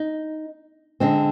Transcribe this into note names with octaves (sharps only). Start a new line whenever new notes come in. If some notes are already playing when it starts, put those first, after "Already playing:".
Already playing: D#4
D3 G#3 C4